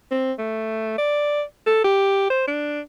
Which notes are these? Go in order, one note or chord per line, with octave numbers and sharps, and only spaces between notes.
C4
A3
D5
A4
G4
C5
D4